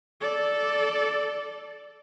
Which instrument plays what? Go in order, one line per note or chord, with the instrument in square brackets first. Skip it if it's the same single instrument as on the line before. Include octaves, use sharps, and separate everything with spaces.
[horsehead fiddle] A4 D5